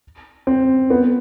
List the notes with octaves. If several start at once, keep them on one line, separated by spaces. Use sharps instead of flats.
C4
B3